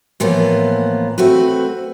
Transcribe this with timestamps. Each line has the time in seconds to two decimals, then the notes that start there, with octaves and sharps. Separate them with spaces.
0.20 A2 E3 F3 A#3 B3
1.18 A3 C4 F#4 B4